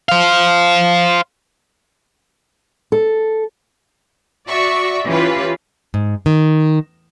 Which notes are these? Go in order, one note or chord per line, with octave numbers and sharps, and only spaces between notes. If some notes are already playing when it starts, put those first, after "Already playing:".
C5 F5
A4
F#4 D5 E5 C#6
E3 C#4 F4 G4 B4
G#2
D#3